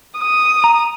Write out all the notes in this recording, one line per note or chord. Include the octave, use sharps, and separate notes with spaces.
D#6
A#5